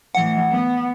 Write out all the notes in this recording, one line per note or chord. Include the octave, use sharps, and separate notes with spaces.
A2 E3 F#5
B3